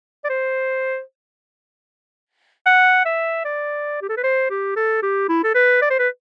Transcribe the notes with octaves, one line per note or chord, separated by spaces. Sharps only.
D5
C5
F#5
E5
D5
G4
A4
B4
C5
G4
A4
G4
E4
A4
B4
D5
C5
B4